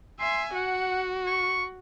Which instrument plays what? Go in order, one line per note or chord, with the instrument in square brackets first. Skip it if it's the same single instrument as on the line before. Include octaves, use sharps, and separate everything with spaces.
[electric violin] E5 G#5 [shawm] C6
[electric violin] F#4 [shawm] F#5
[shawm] C#6